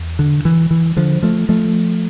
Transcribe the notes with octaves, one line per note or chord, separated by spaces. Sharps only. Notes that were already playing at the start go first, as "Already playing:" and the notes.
Already playing: E2
D3
E3
E3
D3 F3
F3 A3
F3 A3